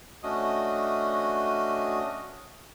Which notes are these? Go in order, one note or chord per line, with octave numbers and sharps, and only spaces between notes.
A3 C#4 D4 F#4 D#5 D#6